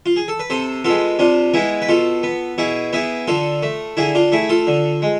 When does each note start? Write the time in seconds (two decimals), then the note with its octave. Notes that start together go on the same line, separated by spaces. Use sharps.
0.06 F4
0.16 G#4
0.28 A4
0.40 B4
0.50 C3 A4 C5
0.85 G#3 B3 F4 A4
1.19 C3 D4 F4
1.54 G#3 B3 E4 G#4
1.82 B4
1.89 B2 F4 A4
2.23 B3
2.58 B2 E4 G#4
2.93 B3 E4 G#4
3.28 D3 F4 A4
3.63 A3
3.97 D3 E4 G#4
4.15 D4 F4
4.32 A3 E4 G#4
4.49 F4 A4
4.67 D3
5.02 G#3